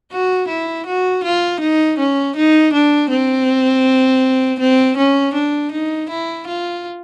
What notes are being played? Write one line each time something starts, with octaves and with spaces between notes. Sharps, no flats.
F#4
E4
F#4
F4
D#4
C#4
D#4
D4
C4
C4
C#4
D4
D#4
E4
F4